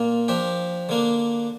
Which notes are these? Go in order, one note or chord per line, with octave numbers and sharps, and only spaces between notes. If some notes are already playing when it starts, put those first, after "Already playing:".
Already playing: A#2 A#3 F4
F3 D4 G4
D3 A#3 D4